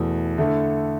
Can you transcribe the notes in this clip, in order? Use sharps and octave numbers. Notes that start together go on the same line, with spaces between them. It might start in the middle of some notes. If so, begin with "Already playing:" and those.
Already playing: E2 B2 A3
D3 A3 E4